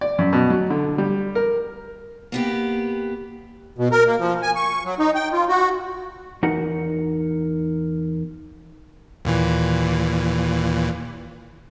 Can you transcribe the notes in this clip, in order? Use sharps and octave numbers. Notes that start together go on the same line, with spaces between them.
D5
F#2
B2
F#3
D3
G3
A#4
A#3 B3 G4
B2
A#4
A#3
F3
G#5
C#6
F#3
D#4
G5
F4
F#4
E2 D#4 F#4 A#4 F#5
D#2 A#2 E3